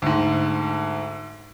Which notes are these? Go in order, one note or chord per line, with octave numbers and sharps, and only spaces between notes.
D2 G#2